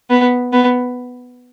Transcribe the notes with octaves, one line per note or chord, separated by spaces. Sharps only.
B3
B3